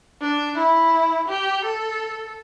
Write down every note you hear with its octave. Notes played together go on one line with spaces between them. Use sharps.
D4
E4
G4
A4